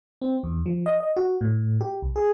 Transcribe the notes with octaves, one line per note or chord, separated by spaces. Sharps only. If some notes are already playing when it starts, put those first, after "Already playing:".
C4
E2
F3
D#5
D#5
F#4
A2
G4
C2
G#4